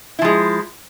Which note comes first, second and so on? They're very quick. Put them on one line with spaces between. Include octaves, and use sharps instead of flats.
E4 F3 G#3